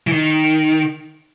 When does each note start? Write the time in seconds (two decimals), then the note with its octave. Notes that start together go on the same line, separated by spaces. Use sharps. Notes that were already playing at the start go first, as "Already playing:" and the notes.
0.07 E3
0.12 D#3